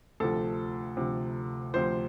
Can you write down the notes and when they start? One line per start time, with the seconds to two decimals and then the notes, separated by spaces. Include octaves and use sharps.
0.20 D2 C3 F3 A4
0.97 D2 C3 F3
1.74 D2 C3 F3 C5